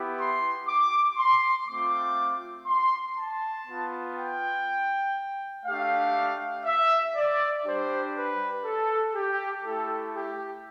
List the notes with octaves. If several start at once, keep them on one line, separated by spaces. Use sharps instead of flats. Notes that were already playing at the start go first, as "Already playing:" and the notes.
Already playing: B3 E4 G4
C6
D6
C6
A3 C4 F4 D6
C6
A5
B3 F4
G5
A3 D4 G4 F5
E5
D5
G3 D4 G4 C5
B4
A4
G4
A3 E4 G4 A4
G4